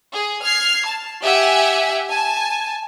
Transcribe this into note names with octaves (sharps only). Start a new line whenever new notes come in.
G#4
F6 G#6 C7
A5
G4 E5 F#5 G#5
G#5 A5